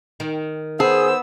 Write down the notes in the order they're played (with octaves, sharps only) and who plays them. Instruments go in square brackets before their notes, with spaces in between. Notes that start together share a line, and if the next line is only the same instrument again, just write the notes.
[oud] D#3
[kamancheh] B3 E6 [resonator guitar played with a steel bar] G#4 [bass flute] C5